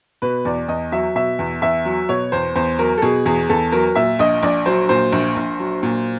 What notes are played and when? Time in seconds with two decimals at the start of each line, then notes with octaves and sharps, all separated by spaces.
0.22 B2 B4
0.45 E2 D5
0.68 E2 D#5
0.92 F#3 E5
1.15 B2 E5
1.39 E2
1.62 E2 E5
1.85 F#3
2.09 B2 C#5
2.32 E2 C5
2.55 E2 C5
2.79 F#3 A#4
2.98 A4
3.02 B2 G#4
3.26 E2 G#4
3.49 E2 A4
3.72 F#3 A#4
3.95 A#2 E5
4.19 A#1 D#5
4.43 A#1 D5
4.66 F#3 C5
4.89 A#2 C5
5.13 A#1
5.36 A#1
5.59 F#3
5.83 A#2